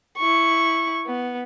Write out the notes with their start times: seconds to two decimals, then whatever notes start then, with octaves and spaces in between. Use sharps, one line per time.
0.18 E4 C#6
1.06 B3